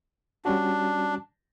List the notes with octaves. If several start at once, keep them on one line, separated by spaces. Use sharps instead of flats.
G3 C#4 D4 F#4